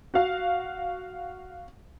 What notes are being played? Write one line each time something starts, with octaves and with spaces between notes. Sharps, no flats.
F#4 F5